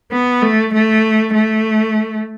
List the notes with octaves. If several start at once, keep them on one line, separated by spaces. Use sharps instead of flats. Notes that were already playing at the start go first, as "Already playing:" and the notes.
B3
A3
A3
A3